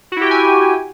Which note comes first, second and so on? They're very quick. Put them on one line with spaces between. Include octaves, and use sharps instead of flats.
F#4 E4 G4 G5 G#5